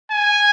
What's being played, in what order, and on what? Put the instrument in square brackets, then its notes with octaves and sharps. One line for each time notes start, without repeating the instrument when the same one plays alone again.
[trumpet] G#5